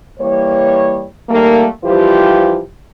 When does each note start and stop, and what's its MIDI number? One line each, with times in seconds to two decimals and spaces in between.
0.20 1.05 52
0.20 1.05 55
0.20 1.05 58
0.20 1.05 73
1.29 1.66 51
1.29 1.66 55
1.29 1.66 57
1.29 1.66 58
1.84 2.59 52
1.84 2.59 53
1.84 2.59 55
1.84 2.59 65
1.84 2.59 67
1.84 2.59 72